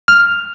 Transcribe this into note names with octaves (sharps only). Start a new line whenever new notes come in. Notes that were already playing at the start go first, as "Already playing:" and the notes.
F6